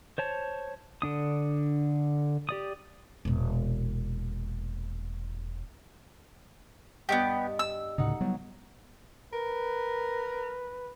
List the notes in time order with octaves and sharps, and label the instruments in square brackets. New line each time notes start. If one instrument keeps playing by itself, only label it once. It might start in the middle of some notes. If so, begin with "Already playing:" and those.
[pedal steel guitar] C5 C#5 A5
D3 D4 D#6
G4 D5 D#6
[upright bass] E1 A#2
[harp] G2 D#5 [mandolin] B3 C4 G4
[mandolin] E6
[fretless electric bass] D2 A2 C#3 [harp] D#4 F#5
[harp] F#3 [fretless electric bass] G3 B3
[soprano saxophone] A#4 [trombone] B4